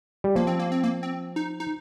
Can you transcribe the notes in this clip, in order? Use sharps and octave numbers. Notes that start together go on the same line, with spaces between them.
G3
F3 A#3
C4
A#3
C4
A#3
C4
D#4
D#4